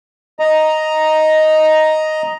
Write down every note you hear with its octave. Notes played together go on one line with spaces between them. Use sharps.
D#5 A#5